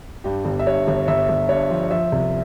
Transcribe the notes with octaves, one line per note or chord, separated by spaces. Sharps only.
G2 G4
G1
E5
G2 C#5
G1
G1 E5
G1
G2 C#5
F3
F3 E5
C2